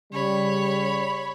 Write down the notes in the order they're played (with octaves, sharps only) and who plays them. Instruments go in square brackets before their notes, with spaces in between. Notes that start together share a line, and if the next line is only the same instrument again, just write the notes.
[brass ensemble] C#3 G3 [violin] C#5 B5